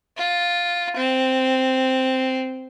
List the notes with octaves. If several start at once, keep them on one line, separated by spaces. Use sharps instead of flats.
F4
C4